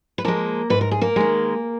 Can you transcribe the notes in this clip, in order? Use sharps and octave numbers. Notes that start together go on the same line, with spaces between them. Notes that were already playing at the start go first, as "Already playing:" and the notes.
B4
F3 G#3 A#3 A#4
G#2 B4
A#4
G#4
A#3 A#4
D#3 G#3